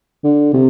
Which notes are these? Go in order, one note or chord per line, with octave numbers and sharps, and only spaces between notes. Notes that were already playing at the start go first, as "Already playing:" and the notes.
D3
C3